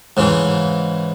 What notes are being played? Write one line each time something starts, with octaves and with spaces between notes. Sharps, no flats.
G#2 C#3 E3